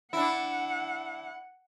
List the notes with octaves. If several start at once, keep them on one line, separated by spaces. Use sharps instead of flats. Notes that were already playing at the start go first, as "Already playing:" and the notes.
D4 E4 F#5